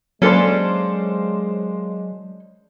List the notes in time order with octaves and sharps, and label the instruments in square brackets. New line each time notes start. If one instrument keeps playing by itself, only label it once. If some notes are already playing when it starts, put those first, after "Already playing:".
[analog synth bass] F#3 [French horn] G#3 [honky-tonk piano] A#3 C5 [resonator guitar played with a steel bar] C#4 D4 A4